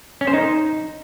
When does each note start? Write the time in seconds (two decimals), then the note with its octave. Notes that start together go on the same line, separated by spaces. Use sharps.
0.21 C#4
0.27 C5
0.34 D#4